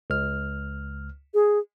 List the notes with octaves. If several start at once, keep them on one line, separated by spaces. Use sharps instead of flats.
C#2 F6
G#4